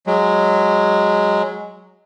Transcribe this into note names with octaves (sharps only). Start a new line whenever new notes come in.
F#3 G#3